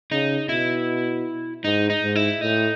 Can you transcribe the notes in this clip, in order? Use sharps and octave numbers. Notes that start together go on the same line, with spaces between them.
C#3 D#4
B2 E4
G#2 D#4
D#4
G#2
E4
A2 D#4